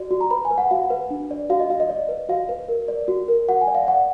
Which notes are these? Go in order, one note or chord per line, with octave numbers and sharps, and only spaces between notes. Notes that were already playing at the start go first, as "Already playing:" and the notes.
Already playing: F#4 D5
F#4
A#5
B4 B5
G#5
B4
F#5
F#4 F5
B4
D4
D5
F#4 F5
D#5
F#4 F5
D#5
D5
B4
F#4 F5
B4
A#4
D5
F#4
A#4
F#4 F#5
G#5
D5
F5
D5 F#5